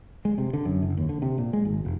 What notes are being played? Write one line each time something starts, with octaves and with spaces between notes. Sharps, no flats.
G#3
C3
D3
F#2
F#1
D#2
D3
C3
A#2
G#3
G#1
F1